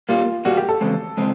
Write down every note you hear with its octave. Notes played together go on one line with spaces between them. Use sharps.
A#2 G3 A#3 F4
A#2 G3 A#3 F#4
G4
A4
E2 C#3 G#3 C4
C#3 G#3 C4